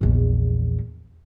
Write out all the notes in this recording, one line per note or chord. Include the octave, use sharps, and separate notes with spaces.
A#1 E2